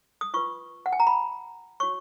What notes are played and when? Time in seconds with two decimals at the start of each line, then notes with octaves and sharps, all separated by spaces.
0.21 D#6
0.34 F4 B4 C#6
0.86 F#5
0.93 G#5
1.00 A#5
1.07 B5
1.80 F#4 C#5 C#6